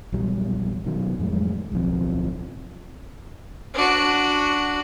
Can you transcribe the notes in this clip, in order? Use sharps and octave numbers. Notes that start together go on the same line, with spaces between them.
A#1 E2 F#3 G3
B2 D#3 F#3
F2 A2 F#3 G#3
D1 B1 F3 C4
D4 F#4